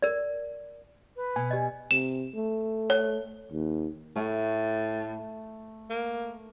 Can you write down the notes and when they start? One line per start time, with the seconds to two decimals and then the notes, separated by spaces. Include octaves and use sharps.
0.02 A#4 D5
1.16 B4
1.36 B2 G#5
1.51 G4 D5 D#5
1.91 C3 E7
2.35 A3
2.90 C#5
3.52 D#2
4.16 A2 A3
5.90 A#3